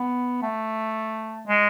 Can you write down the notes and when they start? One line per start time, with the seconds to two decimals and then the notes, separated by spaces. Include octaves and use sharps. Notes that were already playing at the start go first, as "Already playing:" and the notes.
Already playing: B3
0.42 A3
1.47 G#3